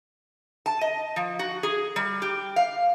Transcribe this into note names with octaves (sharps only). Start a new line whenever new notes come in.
A5
D#5
F3
F#4
G#4
G3
G4
F5